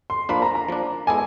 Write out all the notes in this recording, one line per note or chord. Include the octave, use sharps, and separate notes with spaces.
C6
F3 A#3 D4 B5
A#5
A#5
F3 A#3 D4
G#3 B3 E4 A4 D5 G#5